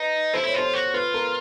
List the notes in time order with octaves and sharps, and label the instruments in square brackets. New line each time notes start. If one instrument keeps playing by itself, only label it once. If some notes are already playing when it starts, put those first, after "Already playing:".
Already playing: [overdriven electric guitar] D#4 [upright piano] B4
[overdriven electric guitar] E4 [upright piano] C5
[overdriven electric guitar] E4 [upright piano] C#5
[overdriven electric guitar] F4 [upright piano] C5
[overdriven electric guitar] F#4
[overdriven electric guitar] F4 [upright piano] B4
[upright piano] A#4